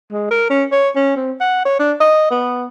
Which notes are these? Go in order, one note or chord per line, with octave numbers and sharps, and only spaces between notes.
G#3
A#4
C#4
C#5
C#4
C4
F#5
C#5
D4
D#5
B3